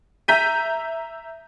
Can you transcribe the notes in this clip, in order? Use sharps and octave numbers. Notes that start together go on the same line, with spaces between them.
E5 A#5 G6 B6 D#7